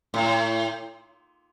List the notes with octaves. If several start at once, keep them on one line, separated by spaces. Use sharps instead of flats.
A2